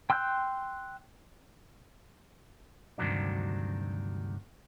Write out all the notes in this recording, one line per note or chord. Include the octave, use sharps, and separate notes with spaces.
G5 C6 E6 F#6 G6
D2 G2 C3 D#3 F#3 D4